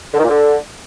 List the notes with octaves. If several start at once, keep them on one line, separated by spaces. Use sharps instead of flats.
D3
D#3
A#2
D3